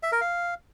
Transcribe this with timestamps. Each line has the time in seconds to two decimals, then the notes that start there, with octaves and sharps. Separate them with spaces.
0.03 E5
0.12 A#4
0.21 F5